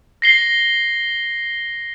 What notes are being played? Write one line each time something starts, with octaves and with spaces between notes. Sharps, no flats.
A#6 C7 G7